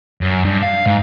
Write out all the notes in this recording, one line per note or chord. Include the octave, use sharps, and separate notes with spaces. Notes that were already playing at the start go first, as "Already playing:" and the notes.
F#2
G2
F5
G#2